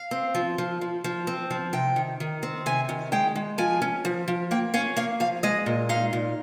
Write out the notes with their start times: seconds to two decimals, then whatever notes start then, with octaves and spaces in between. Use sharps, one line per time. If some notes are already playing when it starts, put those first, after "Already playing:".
Already playing: F5
0.11 C4
0.35 F3
0.58 F3
0.81 F3
1.04 F3
1.27 C4
1.51 F3
1.73 C3 G5
1.96 D#3
2.20 D#3
2.43 C4
2.66 C3 G#5
2.89 D#3
3.12 G#3 G5
3.36 G#3
3.58 F3 G#5
3.82 C#4
4.05 F3
4.28 F3
4.51 A#3 G5
4.74 C#4 F5
4.97 A#3 F5
5.20 F3 F5
5.43 G#3 D#5
5.66 A#2
5.89 D#4 F5
6.13 A#2